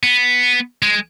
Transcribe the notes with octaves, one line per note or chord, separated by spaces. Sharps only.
B3
G#3